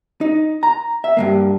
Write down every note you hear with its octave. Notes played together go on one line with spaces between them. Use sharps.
D#4
A#5
E5
G2 C3 A#3